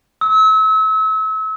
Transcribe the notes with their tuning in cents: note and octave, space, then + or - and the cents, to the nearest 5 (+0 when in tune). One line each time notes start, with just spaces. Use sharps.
E6 -35